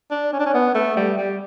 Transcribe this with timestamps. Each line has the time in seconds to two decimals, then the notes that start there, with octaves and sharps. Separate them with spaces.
0.11 D4
0.33 C#4
0.40 D4
0.46 C#4
0.54 B3
0.75 A3
0.97 G3
1.18 G3